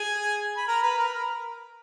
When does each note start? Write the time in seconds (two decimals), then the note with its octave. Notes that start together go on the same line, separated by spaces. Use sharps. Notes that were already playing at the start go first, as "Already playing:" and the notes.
Already playing: G#4 G#5
0.57 B5
0.68 A#4 A#5
0.82 B4 B5
0.98 A#4 A#5
1.08 B5
1.13 A#4 A#5